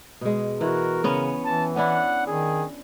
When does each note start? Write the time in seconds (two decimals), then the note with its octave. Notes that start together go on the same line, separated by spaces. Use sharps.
0.21 B2 G#3
0.61 E3 F#4 A#4
1.04 C#3 B3 C#4
1.45 E3 A5
1.76 C#4 D4 E4 F#5
2.27 D#3 G#4